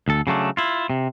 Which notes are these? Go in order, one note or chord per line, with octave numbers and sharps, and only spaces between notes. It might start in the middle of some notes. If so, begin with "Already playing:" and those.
D2 A4
C#3 F#3 A3 D4
E4 F4
C3